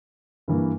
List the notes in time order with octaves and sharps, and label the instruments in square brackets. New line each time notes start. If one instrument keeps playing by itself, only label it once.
[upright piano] G2 E3 A#3